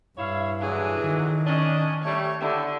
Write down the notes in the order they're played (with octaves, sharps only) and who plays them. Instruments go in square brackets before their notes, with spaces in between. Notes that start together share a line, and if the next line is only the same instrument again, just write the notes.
[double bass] G2 [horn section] E4 C#5 F5
[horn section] D3 E3 F#3 [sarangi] G#4
[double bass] D#3
[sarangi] C#4 [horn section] D4 D#5
[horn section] G3 A3 [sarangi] C#5
[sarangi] D3 [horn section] E4 G4